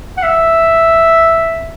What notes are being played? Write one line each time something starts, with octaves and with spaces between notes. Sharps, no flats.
F#5
E5